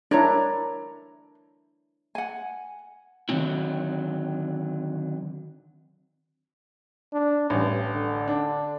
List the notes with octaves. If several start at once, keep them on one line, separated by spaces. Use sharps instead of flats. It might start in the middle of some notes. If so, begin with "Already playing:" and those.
D4 E4 A#4 C#5 A#5
F#5 G#5
D3 D#3 F#3 G3 C4 E4
D4
A1 G2
D3
D4